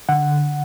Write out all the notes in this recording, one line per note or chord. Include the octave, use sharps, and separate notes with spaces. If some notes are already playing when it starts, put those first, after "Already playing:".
D3 F#5